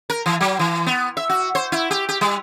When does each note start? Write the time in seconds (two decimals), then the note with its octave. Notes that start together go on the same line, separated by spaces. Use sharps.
0.10 A#4
0.26 E3
0.41 F#3
0.59 E3
0.86 B3
1.17 E5
1.29 F#4
1.55 C5
1.72 E4
1.91 G4
2.09 G4
2.21 G3